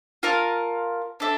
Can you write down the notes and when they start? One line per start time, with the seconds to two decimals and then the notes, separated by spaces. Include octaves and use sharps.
0.23 F4 A#4 F5 A5
1.20 D4 A4 E5